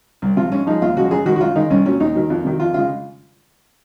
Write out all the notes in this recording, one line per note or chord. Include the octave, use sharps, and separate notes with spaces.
C2
C3 F3 F4
G#2 C#4
F3 G#3 D#4
D#2 F4
C#3 F3 G#3 F#4
F#2 G#4
D#3 G#3 F#4
F#4
F#2 F4
D#3 G#3 D#4
C2 C#4
A#2 F#3 C#4
D#2 D#4
D#3 F#3
F2
C3 D#3 F#3
F2 F4
C#3 G#3 F4